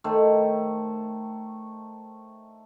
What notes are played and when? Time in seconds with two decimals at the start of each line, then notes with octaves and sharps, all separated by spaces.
0.04 D#3 A3 C5 C#5